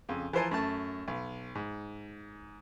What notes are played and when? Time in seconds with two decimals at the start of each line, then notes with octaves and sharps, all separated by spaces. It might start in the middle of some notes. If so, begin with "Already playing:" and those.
0.09 F2 C#3
0.33 E3 F3 A#4 C5 G#5 A5
0.51 F#2 A3 A5
1.08 B1
1.55 G#2